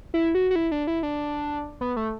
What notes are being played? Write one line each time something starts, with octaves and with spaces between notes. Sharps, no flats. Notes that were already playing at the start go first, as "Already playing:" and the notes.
E4
F#4
F#4
E4
D4
E4
D4
B3
A3